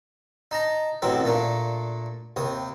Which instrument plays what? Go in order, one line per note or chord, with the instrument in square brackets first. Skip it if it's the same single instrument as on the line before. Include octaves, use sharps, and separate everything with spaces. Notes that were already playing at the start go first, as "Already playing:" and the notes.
[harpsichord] D#4 A5 A#5
A1 B2 F#3 C4 A4
A#2 A3 A#3 D4
D#2 C3 D#6